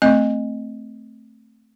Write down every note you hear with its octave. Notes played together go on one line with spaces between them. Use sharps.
A3 C4 D#5